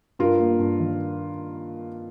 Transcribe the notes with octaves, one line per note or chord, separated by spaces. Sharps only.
G2 F4 A#4
A#3
G2
D#3